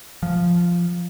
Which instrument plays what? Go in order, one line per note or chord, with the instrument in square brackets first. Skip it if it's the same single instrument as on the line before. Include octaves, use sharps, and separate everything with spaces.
[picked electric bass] F3